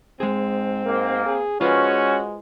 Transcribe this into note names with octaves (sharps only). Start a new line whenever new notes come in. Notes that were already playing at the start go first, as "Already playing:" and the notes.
G#2 G#3 C4 G#4
G#2 A#3
G#4
G#3 C#4 F4 F#4 B4 C5